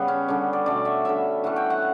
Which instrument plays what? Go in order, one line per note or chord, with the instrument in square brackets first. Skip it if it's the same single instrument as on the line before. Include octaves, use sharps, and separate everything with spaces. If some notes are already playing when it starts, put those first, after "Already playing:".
Already playing: [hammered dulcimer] C#3 G3 B3
C#4
D3 G3 C#4
D5
B2 A3 C#4 D5
E5
D3 G3 C#4 E5
E3 A3 C#4 F#5
G5
F#5